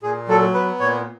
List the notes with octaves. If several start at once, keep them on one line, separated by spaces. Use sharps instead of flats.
A#2 G#4
F#3 A4
B3 B4
A#2 C#5